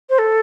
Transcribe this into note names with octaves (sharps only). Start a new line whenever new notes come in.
C5
A4